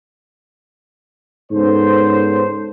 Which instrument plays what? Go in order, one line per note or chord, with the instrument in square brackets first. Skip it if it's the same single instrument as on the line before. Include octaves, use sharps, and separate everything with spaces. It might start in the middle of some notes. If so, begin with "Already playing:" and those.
[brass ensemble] G#2 C#3 B3 A4 C5